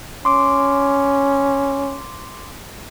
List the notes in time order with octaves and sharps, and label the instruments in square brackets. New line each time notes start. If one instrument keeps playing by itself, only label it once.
[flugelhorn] C#4 [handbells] C6 D6